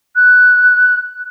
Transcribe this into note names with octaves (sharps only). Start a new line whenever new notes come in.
F#6